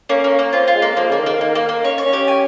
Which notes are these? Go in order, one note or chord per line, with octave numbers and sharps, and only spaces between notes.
A#3 C#4
A#3
A#3
C4 F4
F4
G#3
A#3
F3 A#3
C#3 A#3
D#3
A#3
D#3 A#3
A#3
A#3
C#4 C#5
C#5
C#4
G4
G#5